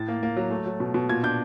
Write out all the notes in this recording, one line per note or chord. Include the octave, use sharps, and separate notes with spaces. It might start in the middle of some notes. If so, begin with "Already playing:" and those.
Already playing: A2 A6
A#3
A#3
F#3
A3
F#3
B2
B2
A#2 G#6
D4 G6